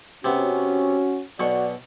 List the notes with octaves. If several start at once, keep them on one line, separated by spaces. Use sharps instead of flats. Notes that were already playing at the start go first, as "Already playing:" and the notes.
C3 B3 C#4 F#4
B1 B2 F#4 D5 C#6